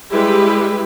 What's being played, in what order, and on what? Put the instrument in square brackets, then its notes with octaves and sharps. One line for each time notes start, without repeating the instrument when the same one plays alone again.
[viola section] G3 G#3 E4 G4 B4